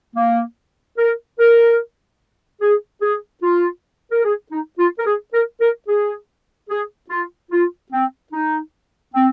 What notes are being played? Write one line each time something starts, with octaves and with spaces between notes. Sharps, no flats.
A#3
A#4
A#4
G#4
G#4
F4
A#4
G#4
D#4
F4
A#4
G#4
A#4
A#4
G#4
G#4
F4
F4
C4
D#4
C4